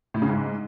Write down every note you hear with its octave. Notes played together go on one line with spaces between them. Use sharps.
A2
C#3
G#2